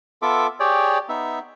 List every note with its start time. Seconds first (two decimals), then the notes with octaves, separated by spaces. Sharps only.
0.22 B3 F4 A4 E5 D6
0.60 G4 G#4 C#5 D5 G5
1.09 B3 D#4 E5